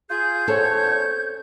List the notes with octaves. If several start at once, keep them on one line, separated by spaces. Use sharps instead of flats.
F4 G#4 G6
E2 C4 C#4 A4 C#5